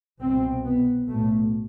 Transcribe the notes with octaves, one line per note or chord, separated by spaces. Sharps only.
C2 B2 C4
B3
B1 A2 A3